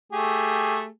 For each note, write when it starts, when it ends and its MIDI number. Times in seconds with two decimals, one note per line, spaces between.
0.13 0.87 57
0.13 0.87 67
0.13 0.87 68